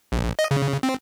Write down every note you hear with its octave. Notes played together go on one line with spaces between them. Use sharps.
A#1
D#5
C#3
C4